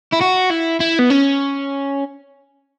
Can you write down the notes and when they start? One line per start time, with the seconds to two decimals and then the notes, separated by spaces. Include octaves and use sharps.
0.13 E4
0.22 F#4
0.51 E4
0.80 E4
0.99 B3
1.10 C#4